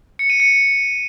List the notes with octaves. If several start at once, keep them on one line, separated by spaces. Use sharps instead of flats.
C#7
D#7
C#7